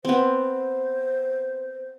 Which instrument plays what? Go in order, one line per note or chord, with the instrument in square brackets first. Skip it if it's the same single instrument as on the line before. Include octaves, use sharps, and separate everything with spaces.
[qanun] B3 C4 [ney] C5